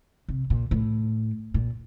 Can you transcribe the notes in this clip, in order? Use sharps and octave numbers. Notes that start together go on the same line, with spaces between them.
C3
A#2
A2
A#2